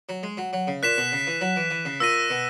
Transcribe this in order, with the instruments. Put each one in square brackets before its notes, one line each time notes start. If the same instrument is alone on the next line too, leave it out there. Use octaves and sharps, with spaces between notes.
[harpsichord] F#3
G#3
F#3
F#3
C#3
[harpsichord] A#2 [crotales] F#6 B6 E7
[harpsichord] B2
C#3
E3
F#3
E3
E3
C#3
[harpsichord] A#2 [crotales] E6 A#6 D#7
[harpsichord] B2